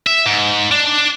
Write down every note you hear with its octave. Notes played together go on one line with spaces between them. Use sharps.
E5
G#2
D4